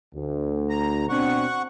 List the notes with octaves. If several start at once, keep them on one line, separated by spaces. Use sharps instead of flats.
D2
A#5
B2 C4 D4 F#5 C#6